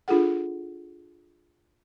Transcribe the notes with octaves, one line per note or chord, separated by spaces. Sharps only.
D4 F4 G#4 A4 F#5